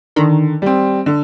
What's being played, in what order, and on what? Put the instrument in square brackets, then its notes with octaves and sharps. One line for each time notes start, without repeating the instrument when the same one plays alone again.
[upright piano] D3 [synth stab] D#3
[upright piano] G3 C4
D3